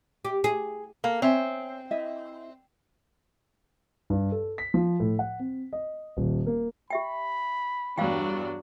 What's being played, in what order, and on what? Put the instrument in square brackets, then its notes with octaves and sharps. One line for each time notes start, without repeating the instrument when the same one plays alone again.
[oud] G4
G#4
[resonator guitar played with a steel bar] A#3 [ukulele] A4
[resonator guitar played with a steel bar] C4 [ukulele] C#5 E5 G#5
[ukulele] E4 D#5 E5
[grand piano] G2
A4
B6
F3
A2
F#5
C4
D#5
D#1
A#3
[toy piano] G4 E5 G5 [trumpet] B5
[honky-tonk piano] E2 G2 [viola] F#3 D4 [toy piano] F5 G5